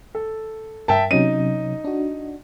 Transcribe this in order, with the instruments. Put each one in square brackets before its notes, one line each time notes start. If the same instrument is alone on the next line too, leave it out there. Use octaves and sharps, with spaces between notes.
[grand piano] A4
[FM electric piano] G2 A#4 [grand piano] E5 G5 A5
[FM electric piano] C3 F#3 C#4 [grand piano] D#4 D#7
[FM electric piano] D4 F#4